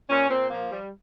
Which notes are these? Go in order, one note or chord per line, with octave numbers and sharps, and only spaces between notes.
A#2 C#4
A#2 C4
F3 A#3
G3